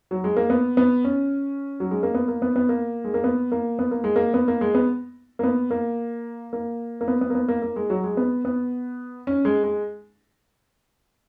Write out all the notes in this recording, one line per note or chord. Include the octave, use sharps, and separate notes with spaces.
F#3
G#3
A#3
B3
B3
C#4
F#3
G#3
A#3
B3
A#3
B3
B3
A#3
G#3
A#3
B3
A#3
B3
A#3
G#3
A#3
B3
A#3
G#3
B3
A#3
B3
A#3
A#3
A#3
B3
B3
A#3
B3
A#3
A#3
G#3
F#3
G#3
B3
B3
C#4
G#3
G#3